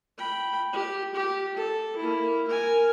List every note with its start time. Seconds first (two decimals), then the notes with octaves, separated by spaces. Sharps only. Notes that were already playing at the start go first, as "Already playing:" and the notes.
0.17 G5 B5
0.73 G4
1.15 G4
1.56 A4
1.97 A#3 E4
2.48 A#4 G#5